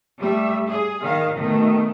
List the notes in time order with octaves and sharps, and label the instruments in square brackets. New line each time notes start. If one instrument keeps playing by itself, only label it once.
[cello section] G3 A3 E5
G#4
D#3 F5
B2 D#3 A3